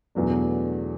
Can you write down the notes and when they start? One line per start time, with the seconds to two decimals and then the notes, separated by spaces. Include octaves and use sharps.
0.15 E2 B2 F#3 A3 D4